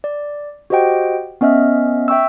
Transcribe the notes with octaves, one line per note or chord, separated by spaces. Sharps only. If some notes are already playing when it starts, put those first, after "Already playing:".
D5
F#4 G4 C5 D#5 F#5 G5
B3 C#4 D#5 E5 F6
E5 G5 C#6 E6